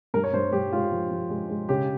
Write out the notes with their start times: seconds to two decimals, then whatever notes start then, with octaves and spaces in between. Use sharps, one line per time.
0.14 G2 A#4
0.24 C#5
0.33 G2 C5
0.52 G2 G4
0.72 G#3 F4
0.92 F3
1.11 F3
1.30 G#3
1.50 G#3
1.69 C#3 G4